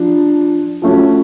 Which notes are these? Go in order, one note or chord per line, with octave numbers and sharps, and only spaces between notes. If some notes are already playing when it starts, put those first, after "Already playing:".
Already playing: F3 D4
F3 A3 C#4 F#4